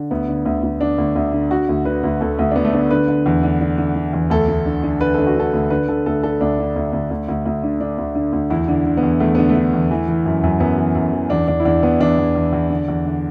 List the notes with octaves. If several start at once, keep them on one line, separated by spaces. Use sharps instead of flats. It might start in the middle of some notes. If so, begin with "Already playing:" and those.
Already playing: D3
D2 B3
D3
D2
D2
D3 D4
D2
D2
D3
D3 F#4
D2
D3 B4
D2
D2 A4
D2
D4
D2 B3
A3
D3 B3
D3 B4
D3
E2
D3
D3
D3
D3
E2
D2 A4
D2
D3
D3
D3 B4
D3 A4
F#4
D3 A4
D2
D3 B4
D3 A4
D2 A4
D3 A4
D2 D4
D3
D2
D2
D2
D2
D2
D3
D3 D4
D2
D3
D2
E2 E4
D3
D3
B3
E2
E2 A3
D3 B3
A3
D3
E2
E3
E3
F#2
F#2
F#2 B3
E3
F#2
E3
E2 D4
E2 D4
E4
E2 D4
E2 B3
E2 D4
E2
E2
E2
D3
E2
D3